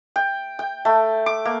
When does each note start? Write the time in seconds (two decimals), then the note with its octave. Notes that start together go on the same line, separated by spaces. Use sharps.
0.16 G5
0.59 G5
0.85 A3
1.26 D6
1.45 A#3